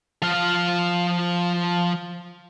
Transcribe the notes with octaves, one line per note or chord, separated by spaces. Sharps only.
F3 F5